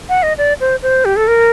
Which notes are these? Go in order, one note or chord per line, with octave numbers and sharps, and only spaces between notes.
F#5
D#5
D5
C5
C5
G4
A4
A#4